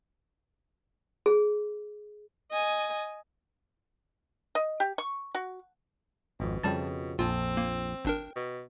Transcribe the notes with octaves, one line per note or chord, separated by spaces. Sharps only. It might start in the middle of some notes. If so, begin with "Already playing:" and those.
G#4
D#5 G#5
D#5
G4
C#6
F#4
G#1 F2 B2
F2 C#3 G3 G5 A5 A6
A#1 F2 C4 F4 A5
A#3
G#1 D4 A#4 G5
B2